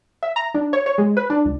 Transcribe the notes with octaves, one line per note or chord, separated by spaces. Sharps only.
E5
A#5
D4
C#5
C#5
G#3
B4
D4
C#2